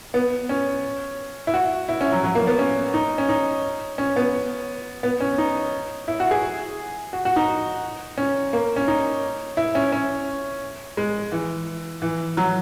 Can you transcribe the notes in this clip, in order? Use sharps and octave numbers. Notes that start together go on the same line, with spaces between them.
B3
C#4
E4
F#4
E4
C#4
F#3
F#3
A#3
B3
C#4
D#4
C#4
D#4
C#4
B3
B3
C#4
D#4
E4
F#4
G#4
F#4
F#4
D#4
C#4
A#3
C#4
D#4
E4
C#4
C#4
G#3
E3
E3
F#3